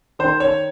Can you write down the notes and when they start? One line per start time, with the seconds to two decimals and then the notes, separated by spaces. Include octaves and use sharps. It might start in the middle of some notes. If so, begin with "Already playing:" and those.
0.19 D#3 C5
0.40 C#5